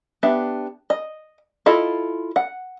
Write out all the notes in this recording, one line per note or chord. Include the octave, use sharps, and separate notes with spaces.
B3 D4 G4 E5
D#5
E4 F4 A4 D#5
F#5